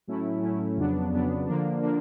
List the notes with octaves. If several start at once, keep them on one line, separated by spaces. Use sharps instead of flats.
A2 F#3 A3 C#4 E4
A2 F#3 A3 C#4 E4
F2 C#3 F#3 B3 D4
F2 C#3 F#3 B3 D4
D3 F3 A#3 D4
D3 F3 A#3 D4